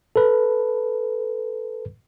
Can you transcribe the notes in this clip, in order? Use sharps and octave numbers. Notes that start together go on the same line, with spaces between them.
A4 B4